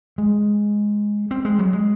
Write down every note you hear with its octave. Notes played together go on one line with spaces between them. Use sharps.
G#3
C4
G#3
F#3
G#3